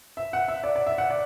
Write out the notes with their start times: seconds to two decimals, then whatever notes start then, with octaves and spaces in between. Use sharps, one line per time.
0.17 E5
0.33 F#5
0.48 E5
0.64 D5
0.76 D5
0.86 E5
0.98 F#5
1.10 D5